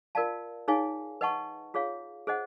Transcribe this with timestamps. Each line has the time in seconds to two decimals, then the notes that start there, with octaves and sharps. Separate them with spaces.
0.15 F4 A#4 D5 F5 A5
0.68 D#4 G#4 C#5 F5 G#5
1.21 B4 D#5 F#5 A5 C#6
1.74 F4 G#4 C#5 F5
2.27 G#4 C5 D#5 F#5